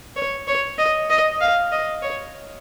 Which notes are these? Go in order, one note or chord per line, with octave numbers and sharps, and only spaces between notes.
C#5
C#5
D#5
D#5
F5
D#5
C#5